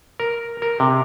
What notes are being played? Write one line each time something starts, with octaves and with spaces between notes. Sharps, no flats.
A#4
A#4
C3